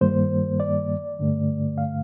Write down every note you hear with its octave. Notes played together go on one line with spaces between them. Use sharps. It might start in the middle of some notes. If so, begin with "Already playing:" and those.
G2 D#3 G3 A#3 C5
D5
G2 D3 A3
F5